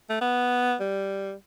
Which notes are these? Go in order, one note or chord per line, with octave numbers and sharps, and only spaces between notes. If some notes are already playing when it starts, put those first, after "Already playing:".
A3
B3
G3